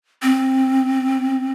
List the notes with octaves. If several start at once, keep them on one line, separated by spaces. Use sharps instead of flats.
C4